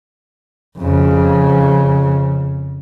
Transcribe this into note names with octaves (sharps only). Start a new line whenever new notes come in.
F2 C#3